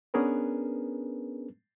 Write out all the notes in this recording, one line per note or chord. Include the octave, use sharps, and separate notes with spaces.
B3 C#4 D4 G#4 A#4 B4